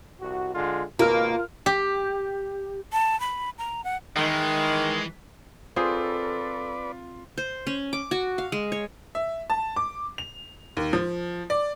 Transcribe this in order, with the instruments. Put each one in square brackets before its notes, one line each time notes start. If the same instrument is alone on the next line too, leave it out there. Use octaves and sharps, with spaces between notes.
[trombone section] C2 F#4
D3 G#3 F4
[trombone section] G#1 B2 [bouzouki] A#3 [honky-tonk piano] F4 A#4 F6
[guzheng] G4
[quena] A5
B5
A#5
F#5
[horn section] D#3 [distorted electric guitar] E3 [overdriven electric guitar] G#3
[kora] C4 G#4 C5 [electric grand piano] F4 [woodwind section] A4 [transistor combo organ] B4 D5
[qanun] C5
C#4
D6
F#4
F5
G#3
C#5
[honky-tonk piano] E5
A5
D6
F7
D#2
F3
D5